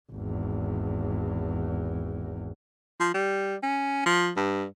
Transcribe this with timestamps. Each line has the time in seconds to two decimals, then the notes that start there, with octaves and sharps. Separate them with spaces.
0.12 G#1 E2
3.00 F3
3.14 G3
3.63 C#4
4.06 F3
4.36 G2